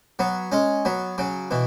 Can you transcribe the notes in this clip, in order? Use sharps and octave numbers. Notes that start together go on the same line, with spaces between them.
F#3 B3
G#3 C#4
F#3 B3
C#3 F#3
B2 E3